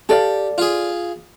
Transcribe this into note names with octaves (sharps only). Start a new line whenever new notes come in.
G4 A4 D5 F5
F4 G#4